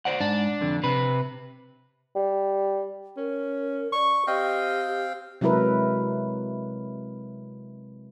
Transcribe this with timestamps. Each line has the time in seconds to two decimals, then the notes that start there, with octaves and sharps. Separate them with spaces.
0.05 C5 D5 F#5
0.20 G#2 D4
0.62 F2 D3
0.84 C3 B4
2.15 G3
3.17 C#4 A#4
3.93 D5 C#6
4.27 C4 G4 D#5 F5 G5
5.41 C3 F#3 G#3 E4 A#4 B4